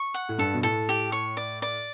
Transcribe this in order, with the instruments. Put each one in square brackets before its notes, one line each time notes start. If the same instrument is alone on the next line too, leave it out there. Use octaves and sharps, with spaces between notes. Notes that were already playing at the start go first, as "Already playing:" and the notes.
Already playing: [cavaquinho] C#6
F#5
[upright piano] A2
[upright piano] G2 [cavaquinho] A4
[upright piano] B2
[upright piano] A2 [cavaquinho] A4
[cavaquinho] G4
C#5
D5
D5